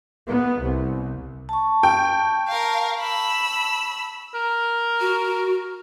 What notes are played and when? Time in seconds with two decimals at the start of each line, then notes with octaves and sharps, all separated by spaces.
0.28 B3
0.61 C2
1.49 A5 C#6
1.83 G5
2.48 A#4 F5
3.00 B5 E6
4.34 A#4
5.00 F#4